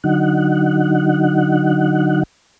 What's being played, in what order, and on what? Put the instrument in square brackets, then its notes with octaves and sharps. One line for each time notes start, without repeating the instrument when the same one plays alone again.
[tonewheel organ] D3 F#3 D#4 F#5